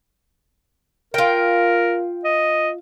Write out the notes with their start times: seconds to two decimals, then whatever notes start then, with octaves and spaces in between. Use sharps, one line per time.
1.14 F4 A#4 G5
2.24 D#5